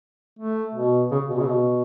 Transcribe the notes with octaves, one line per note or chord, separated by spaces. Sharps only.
A3
B2
C#3
B2
C#3
B2